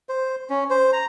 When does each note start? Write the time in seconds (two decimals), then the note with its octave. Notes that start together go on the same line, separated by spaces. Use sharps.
0.09 C5
0.50 C#4
0.70 C5
0.93 A#5